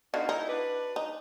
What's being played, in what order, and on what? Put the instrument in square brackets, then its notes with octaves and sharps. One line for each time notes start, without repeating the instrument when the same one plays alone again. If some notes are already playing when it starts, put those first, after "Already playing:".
[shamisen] D3 D#3 F#4 [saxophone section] B3 D4 F5
[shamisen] D#4 [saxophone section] E4
[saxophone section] D4 F#4 B4
[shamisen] D#4